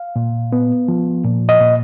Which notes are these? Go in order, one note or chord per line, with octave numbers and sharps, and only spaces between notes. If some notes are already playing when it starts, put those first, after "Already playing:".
Already playing: F5
A#2
B3
F3
A#2
D#5
A#2